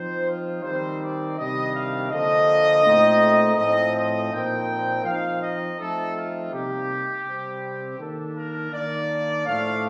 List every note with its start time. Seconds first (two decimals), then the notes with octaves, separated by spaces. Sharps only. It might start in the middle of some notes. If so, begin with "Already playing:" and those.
Already playing: F3 C4 D#4 C5
0.27 F4
0.63 D#3 G3 C4 D#4 C5
1.00 D5
1.37 C3 D#3 G3 D4 D#5
1.74 F5
2.10 D3 F3 A#3 D#5
2.84 A#2 A3 C4 D#4
3.57 A2 F3 C4 D#5
3.94 D#5
4.30 A#2 F3 C4 D#4 G5
5.05 F3 C4 D#4 F5
5.41 D#5
5.79 F3 A3 C4 D#4 A4
6.15 F4
6.51 C3 G3 A#3 D#4 G4
7.25 C3 G3 C4
7.98 D#3 A#3 D4 A4
8.35 A#4
8.72 D#3 A#3 D4 D5
9.46 A2 F3 A3 D4 F5